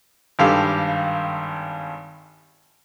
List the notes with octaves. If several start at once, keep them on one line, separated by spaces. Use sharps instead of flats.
G#1 G2 G4 A4 F5